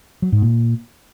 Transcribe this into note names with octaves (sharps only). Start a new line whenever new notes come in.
F#3
G#2
A#2